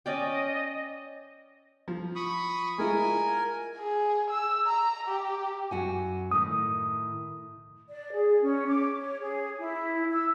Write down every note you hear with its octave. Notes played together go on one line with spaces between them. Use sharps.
C#4 D5 D#5 G5
F3
B5 C#6 D#6
G#3 E4 F4 A#4 G#5
G#4
E6
A#5
G4
F#2 F#4 G#5
A2 D#3 D#6
D5
G#4
C#4
D6
C#5
G#4
E4
E6